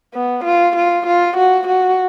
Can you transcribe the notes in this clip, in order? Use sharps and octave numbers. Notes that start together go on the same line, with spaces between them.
B3
F4
F4
F4
F#4
F#4